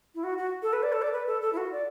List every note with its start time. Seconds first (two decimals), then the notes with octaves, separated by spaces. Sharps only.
0.15 E4
0.24 F#4
0.38 F#4
0.62 A4
0.73 B4
0.83 D5
0.92 A4
1.02 D5
1.13 B4
1.27 A4
1.42 A4
1.53 E4
1.57 F#4
1.72 D5